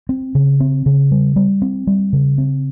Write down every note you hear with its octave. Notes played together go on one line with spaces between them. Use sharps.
C4
C#3
C4
C#3
G3
G3
C4
G3
C#3
C4